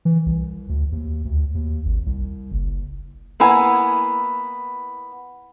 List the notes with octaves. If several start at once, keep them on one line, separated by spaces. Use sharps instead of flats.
E3
C2
D2
D#2
D2
D#2
G#1
C2
F#1
A#3 B3 E4 G#5